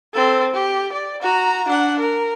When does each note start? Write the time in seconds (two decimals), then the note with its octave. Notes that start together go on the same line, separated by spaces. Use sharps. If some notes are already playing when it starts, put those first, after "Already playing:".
0.14 C4 A4
0.54 G4
0.92 D5
1.22 F#4 A#5
1.69 D4 F#5
1.99 A#4